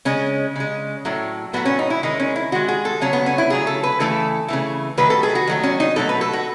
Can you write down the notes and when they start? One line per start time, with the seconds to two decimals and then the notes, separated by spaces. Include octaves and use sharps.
0.05 C#3 G#3 C#4
0.56 C#3 G#3
1.05 A2 F#3 A3
1.53 A2 F#3 A3 B3
1.65 C#4
1.79 D#4
1.90 E4
2.03 D#3 G#3 D#4
2.20 C#4
2.36 E4
2.52 D#3 G#3 F#4
2.68 G#4
2.85 A4
3.01 C#3 F#3 A3 C#4
3.13 B3
3.26 C#4
3.38 E4
3.50 C#3 F#3 A3 G#4
3.67 A4
3.83 B4
4.00 C#3 E3 A3 A4
4.48 C#3 E3 A3
4.98 D#3 F#3 A3 B4
5.10 A4
5.23 G#4
5.35 F#4
5.47 D#3 F#3 A3
5.63 C#4
5.80 D#4
5.96 B2 F#3 A3 A4
6.09 B4
6.21 A4
6.33 F#4